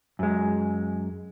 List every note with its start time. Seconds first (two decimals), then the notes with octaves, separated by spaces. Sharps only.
0.19 F#2 G#3